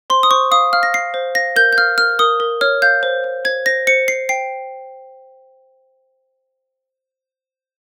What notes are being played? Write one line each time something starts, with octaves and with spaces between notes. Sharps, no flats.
C5 C6
D#6
C5 C#6
F5 D#6
F5 F6
A#6
F5 C7
C5
F5 A#6
A#4 G6
G6
F5 F6
A#4 F6
A#4 D#6
A#4
C#5 F6
F5 G6
C5
C5
C5 G#6
C5 A#6
C5 C#7
C5 C7
G5 C7